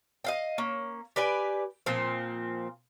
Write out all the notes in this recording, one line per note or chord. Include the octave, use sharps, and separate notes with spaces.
D#5 F5 G5
A#3 C#4
G4 B4 D5 G#5
A#2 F3 C4